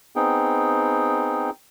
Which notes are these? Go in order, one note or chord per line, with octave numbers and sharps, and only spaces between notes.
B3 C4 D#4 G#4 G5